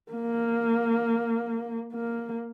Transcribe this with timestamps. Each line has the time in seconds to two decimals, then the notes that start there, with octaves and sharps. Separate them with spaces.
0.12 A#3
1.93 A#3